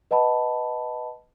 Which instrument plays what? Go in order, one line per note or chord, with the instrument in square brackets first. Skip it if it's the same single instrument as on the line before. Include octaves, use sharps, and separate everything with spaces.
[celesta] B4 D#5 F#5 A5 B5